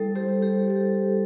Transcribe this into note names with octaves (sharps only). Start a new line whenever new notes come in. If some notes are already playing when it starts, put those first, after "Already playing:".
Already playing: G3 E4 A4
G4 C5
G4
A4